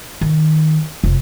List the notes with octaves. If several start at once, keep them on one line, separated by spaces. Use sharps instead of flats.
D#3
F1